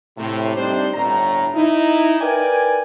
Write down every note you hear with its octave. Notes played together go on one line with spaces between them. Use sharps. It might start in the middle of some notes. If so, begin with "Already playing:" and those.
A2 C3
G3 C4 D4 D#4 C5
G1 A2 A#5
D#4 E4
A#4 B4 D5 G5 G#5